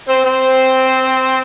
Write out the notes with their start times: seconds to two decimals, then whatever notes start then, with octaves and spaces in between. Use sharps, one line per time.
0.09 C4 C5
0.25 C4 C5